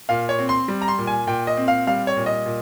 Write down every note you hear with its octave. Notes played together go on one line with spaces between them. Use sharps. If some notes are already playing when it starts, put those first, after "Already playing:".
A#2 F5
C#5
C4
C6
G3
A#5
C6
A#2
G#5
A#2 G5
D#5
C4
F5
G3 F5
C#5
A#2
D#5
A#2